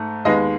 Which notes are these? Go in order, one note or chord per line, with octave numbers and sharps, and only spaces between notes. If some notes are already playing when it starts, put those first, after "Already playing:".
Already playing: G#2 A3
D#2 D#3 G#3 B3 D#5